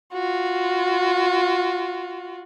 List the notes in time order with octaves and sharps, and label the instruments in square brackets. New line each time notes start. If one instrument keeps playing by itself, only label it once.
[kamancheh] F4 F#4